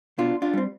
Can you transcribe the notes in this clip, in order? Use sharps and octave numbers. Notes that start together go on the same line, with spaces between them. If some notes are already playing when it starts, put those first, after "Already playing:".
B2 D4 F4
D4 F4
G3 C4